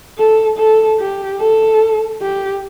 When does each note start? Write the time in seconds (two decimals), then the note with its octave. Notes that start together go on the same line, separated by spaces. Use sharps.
0.18 A4
0.58 A4
1.00 G4
1.40 A4
2.22 G4